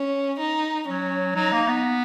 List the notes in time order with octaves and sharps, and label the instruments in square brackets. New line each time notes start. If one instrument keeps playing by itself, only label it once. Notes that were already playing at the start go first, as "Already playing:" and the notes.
Already playing: [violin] C#4
D#4
[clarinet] F#3 [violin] C#4
[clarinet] F#3 [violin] D#4
[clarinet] A#3
B3